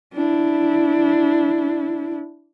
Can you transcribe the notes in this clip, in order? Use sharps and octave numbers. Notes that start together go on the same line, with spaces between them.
D4 E4